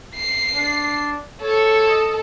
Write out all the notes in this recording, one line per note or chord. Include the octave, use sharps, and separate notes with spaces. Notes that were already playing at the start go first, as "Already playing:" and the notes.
C7
D4
A4 C#5
D#5